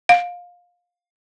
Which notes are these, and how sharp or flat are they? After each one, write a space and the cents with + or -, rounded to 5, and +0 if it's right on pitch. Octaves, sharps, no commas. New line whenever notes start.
F5 +20